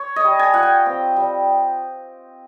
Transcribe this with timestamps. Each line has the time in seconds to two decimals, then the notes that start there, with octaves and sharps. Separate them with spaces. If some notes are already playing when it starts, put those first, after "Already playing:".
Already playing: C#5
0.16 D#5
0.24 G3
0.39 G#5
0.54 F4 F#5
0.63 G5
0.86 C4
1.16 G3